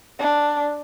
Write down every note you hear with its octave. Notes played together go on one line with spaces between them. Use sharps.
D4